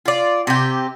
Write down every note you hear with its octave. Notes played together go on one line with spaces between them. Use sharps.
F4 D5
C3 G4